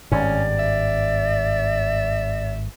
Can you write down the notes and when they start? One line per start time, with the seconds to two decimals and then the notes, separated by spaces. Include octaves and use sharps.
0.12 G#1 G2 C#4 D5
0.59 E5